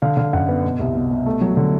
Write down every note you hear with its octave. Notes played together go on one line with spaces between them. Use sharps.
D3 F5
D3 F5
F#2 F#5
B3
B2
C2
B2
B2
A3
F#3
D3